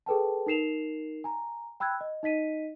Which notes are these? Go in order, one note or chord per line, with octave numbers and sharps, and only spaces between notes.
G#4 A4 B4 G5 A5
D#4 A#4 C7 E7 F7
G#5 A#5
G5 B5 E6 F#6 G#6
D#5
D#4 D#5 B6 D#7